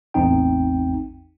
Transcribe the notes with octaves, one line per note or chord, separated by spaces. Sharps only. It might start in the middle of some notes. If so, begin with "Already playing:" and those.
A1 E2 C4 D#4 G5